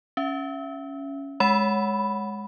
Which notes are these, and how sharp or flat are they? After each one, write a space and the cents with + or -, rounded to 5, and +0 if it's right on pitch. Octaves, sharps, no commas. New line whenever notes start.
C#4 +0 E5 +30
G#3 +0 F#5 +0 B5 +0